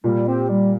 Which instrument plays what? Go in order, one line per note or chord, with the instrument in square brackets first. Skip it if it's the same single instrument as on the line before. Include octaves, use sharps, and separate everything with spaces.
[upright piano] A#2 [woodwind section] G3
[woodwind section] C4 G4
G3